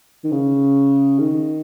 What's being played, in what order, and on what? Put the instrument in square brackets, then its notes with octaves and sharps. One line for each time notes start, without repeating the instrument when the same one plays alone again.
[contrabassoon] D#3
C#3
D#3